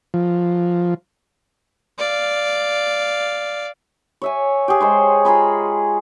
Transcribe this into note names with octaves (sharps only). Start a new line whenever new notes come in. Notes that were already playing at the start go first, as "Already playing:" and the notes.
F3
D5 F5
C#5 E5 G#5
G4 G#4
G#3 C5 C#5
F4 G#4 A#5 B5